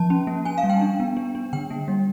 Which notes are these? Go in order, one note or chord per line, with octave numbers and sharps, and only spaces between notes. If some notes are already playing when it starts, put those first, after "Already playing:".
Already playing: F3 A5
C#4
A#3
C#4 G#5
F5
G3
G5
D4
B3
D4
D4
D3 G5
A#3
G3